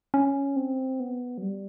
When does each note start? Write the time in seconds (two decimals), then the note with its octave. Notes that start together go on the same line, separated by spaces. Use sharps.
0.14 C#4
0.56 C4
1.00 B3
1.38 F#3
1.42 G3